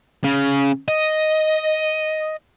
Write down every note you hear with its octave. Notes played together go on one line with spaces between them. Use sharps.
C#3
D#5